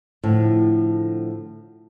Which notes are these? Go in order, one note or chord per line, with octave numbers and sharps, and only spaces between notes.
A2 D3 F3